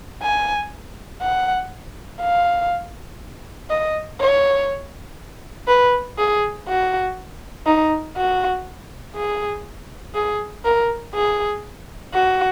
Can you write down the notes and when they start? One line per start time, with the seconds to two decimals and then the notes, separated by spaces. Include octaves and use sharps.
0.23 G#5
1.22 F#5
2.21 F5
3.71 D#5
4.20 C#5
5.68 B4
6.18 G#4
6.68 F#4
7.67 D#4
8.16 F#4
9.16 G#4
10.15 G#4
10.65 A#4
11.15 G#4
12.14 F#4